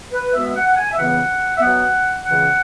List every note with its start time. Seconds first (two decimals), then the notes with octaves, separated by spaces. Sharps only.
0.13 B4
0.34 B2 G#3 B3 E5
0.46 E5
0.56 F#5
0.77 G#5
0.91 E5
0.98 C#2 C#3 E3 B3 F#5
1.56 E5
1.61 B2 F#3 B3 F#5
2.25 C#2 C#3 E3 C#4 F#5